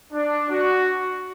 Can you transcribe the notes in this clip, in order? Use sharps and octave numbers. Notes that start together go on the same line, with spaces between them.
D4
F#4